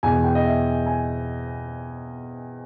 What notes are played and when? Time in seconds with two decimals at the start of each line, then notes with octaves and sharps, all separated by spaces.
0.03 E2 B2 G#5
0.24 G5
0.35 D#5
0.45 E5
0.86 G#5